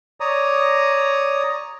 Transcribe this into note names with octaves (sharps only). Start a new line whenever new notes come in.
C#5 D5 A#5 D#6